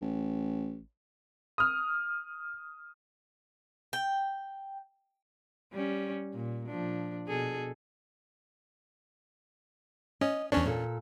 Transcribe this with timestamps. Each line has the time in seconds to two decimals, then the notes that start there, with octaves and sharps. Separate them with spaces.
0.02 A1
1.58 D#6 F6
3.93 G5
5.73 G3 C#4
6.34 A#2
6.67 A#2 F3 D4
7.27 B2 G#4 A4
10.21 C#4 D#5
10.52 E2 C#4 D4 C#5
10.66 A#2 A4